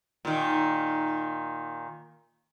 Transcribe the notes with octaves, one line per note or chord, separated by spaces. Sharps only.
A#2 D#3